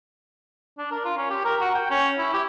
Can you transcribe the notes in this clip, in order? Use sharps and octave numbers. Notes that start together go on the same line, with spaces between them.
D4
A#4
F4
C#4
G4
A#4
F#4
G5
C#4
E4
G4